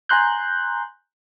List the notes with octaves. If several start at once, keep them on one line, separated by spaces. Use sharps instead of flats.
G#5 A#5 C6 F#6 G6